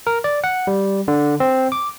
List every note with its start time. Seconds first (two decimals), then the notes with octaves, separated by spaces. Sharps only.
0.07 A#4
0.24 D5
0.44 F#5
0.67 G3
1.08 D3
1.40 C4
1.72 D6